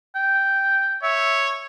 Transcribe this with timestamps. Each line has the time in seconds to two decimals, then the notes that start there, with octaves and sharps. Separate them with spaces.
0.15 G5
1.03 C#5 E5